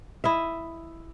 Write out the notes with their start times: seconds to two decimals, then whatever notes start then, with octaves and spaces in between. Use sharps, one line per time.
0.24 E4 D#5 E5